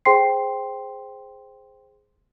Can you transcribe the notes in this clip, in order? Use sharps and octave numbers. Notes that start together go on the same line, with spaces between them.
G#4 C5 G5 C6 C7